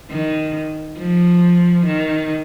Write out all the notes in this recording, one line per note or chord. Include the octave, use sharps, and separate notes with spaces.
D#3
F3
D#3